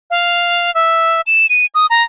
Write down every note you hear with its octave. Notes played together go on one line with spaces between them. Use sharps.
F5
E5
E7
D#7
D#6
A#5